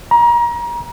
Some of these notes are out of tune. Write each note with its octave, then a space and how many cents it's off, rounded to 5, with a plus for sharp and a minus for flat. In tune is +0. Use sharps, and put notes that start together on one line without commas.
A#5 +30